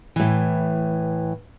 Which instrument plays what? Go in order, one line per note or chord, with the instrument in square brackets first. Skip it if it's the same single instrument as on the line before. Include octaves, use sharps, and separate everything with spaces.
[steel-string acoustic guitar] A2 E3